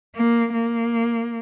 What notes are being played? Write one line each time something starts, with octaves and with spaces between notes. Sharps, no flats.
A#3
A#3